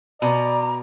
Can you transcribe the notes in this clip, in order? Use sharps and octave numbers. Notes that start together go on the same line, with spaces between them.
B2 D5 A#5